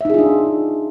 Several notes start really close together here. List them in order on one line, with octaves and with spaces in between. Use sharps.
E5 D#4 G#4 F4 D4